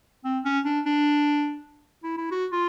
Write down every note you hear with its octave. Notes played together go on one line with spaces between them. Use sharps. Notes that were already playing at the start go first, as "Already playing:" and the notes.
C4
C#4
D4
D4
E4
E4
F#4
F4